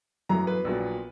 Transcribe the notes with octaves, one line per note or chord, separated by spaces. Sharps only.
F#2 E3 B3 A#5
B4
A#1 A#2 F#3 B3